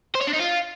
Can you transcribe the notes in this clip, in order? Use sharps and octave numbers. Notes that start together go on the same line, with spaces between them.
C5
C#5
D4
D#4
F4